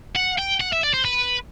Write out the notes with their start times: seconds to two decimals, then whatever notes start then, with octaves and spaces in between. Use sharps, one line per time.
0.15 F#5
0.38 G5
0.60 F#5
0.72 E5
0.83 D5
0.94 C5
1.05 B4